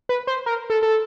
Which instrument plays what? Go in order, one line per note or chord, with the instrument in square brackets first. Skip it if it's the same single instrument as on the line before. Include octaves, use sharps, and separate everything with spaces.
[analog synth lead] B4
C5
A#4
A4
A4